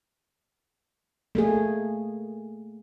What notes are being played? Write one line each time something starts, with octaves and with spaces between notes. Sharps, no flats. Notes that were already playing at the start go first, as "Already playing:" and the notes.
A3 A#3 G#4